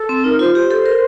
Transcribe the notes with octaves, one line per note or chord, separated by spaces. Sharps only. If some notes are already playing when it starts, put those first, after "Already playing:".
Already playing: A4
C4
D#4 A#4
F4 C5
G4 C5
A4
A#4